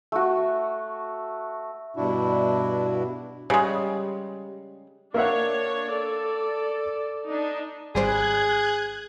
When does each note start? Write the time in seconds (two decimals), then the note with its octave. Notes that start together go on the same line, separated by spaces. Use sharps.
0.12 A3 F#4
1.96 G2 B2 D4 E4 F#4
3.50 C#3 G3 G#3
5.14 A#3 D4 C#5 E5 F#5
5.89 A4 D5
7.26 D4 D#4
7.95 G#1 G3 G#4 C5 F#6 G#6